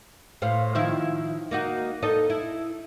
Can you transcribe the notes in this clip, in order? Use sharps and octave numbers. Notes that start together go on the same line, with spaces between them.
A2 C5 F5
D#3 F3 E4
A#3 D#4 F#4
D#4 A4 D#5
E4